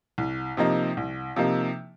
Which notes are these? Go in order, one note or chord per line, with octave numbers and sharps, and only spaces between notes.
C2
C3 F3 A#3 D#4
C2
C3 F3 A#3 D#4